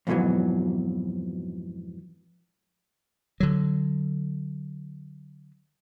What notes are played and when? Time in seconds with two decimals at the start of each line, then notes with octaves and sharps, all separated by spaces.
0.07 F2 G#2 B2 D3 E3 F#3
3.40 D3 F#3